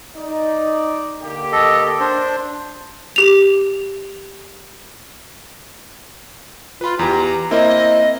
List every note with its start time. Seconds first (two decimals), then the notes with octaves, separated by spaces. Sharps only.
0.17 D#4 D5
1.21 D3 A#3 G4
1.52 A4 D#5
2.00 D4 C5
3.16 G4 F7
6.81 F4 B4 B5
6.99 E2 G4 A#5
7.51 A#3 C4 E4 D#5